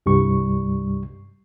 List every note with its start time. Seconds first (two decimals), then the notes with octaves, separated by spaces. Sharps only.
0.06 C2 G2 G3 C#6